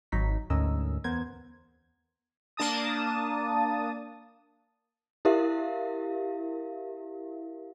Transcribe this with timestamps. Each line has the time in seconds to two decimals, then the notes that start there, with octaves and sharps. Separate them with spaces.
0.12 G#1 F#3 D#4 B6
0.50 D2 G#2 C#4 A#4 D#5 E6
1.04 E2 B3 A#4 C5 G#6
2.57 A#3 D4 A5 D#6
5.25 E4 G4 A#4 E5 F5